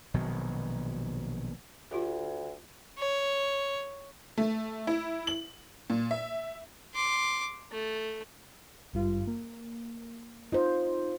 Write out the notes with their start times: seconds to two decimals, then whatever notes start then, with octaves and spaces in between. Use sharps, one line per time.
0.14 A#1 B2 D#3 F#3
1.91 D2 F4 G4 A4
2.98 C#5
4.38 A3
4.87 E4
5.27 F#7
5.90 A#2
6.11 E5
6.94 C6 D6
7.71 A3
8.93 G#1 G2 F4
9.27 A#3
10.52 D#4 F4 C5